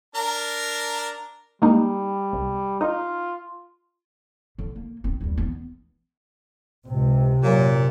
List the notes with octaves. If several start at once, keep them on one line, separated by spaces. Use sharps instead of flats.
D4 A#4 A#5
G3 G#3 A#3 D#4
C2
D#4 F4
D3
A#3
C4
D#2 G3
E3 B3
C#2 C3
F#2 A#2 F#3